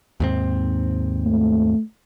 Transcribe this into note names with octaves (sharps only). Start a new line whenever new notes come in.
D#2 G#2 C4
A3